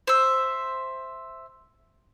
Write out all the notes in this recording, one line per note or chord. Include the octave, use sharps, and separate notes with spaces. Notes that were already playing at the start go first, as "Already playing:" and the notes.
C5 E5